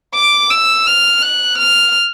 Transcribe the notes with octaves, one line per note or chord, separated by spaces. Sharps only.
D6
E6
F6
F#6
F6